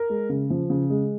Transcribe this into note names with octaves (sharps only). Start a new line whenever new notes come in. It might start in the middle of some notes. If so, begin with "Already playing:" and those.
Already playing: A#4
G#3
C#3
F3
C#3
G#3